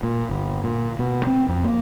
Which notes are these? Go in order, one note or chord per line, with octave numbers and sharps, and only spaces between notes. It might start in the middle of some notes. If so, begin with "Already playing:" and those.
A#2
G1
A#2
B2
C4
F2
A#3